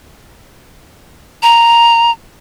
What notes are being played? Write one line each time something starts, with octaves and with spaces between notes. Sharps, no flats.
A#5